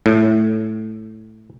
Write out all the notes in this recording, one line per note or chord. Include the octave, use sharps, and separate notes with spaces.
A2